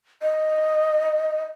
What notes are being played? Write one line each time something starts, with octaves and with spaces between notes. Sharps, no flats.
D#5